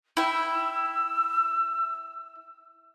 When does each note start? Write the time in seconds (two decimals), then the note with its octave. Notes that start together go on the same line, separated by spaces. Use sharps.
0.17 E4 G5 E6